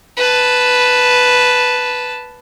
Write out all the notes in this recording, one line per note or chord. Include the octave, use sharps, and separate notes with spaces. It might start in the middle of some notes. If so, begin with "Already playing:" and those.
B4 A5